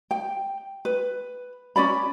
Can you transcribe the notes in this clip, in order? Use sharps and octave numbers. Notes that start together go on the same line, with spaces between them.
G5
B4
C#4 F4 D5 B5